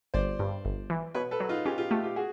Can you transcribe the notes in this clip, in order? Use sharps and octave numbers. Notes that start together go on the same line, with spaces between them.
G1 C5 D5
G2
G1
E3
B2 B4 C#5
A4 B4
F#3
D#4 F4
C#4 F4 G4
F4 G4
A3 F4 G4
F4 G4
F#4 G#4